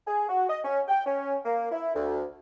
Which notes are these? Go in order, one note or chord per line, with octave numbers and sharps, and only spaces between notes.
G#4
F#4
D#5
C#4
G5
C#4
A#3
E4
D2